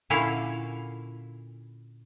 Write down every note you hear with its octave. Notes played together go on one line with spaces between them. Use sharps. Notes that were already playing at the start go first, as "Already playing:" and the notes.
A#2 D3 C#4 E4 F5 G#5